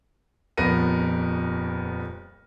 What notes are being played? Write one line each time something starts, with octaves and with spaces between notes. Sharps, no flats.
D#1 F2 B3 A#4 A#6 D#7